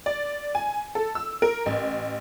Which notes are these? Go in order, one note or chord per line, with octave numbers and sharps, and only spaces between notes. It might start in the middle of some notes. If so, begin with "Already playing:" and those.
D5
G#5
A4
E6
A#4
A1